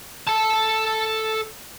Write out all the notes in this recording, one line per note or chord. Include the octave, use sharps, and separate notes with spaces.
A4 A5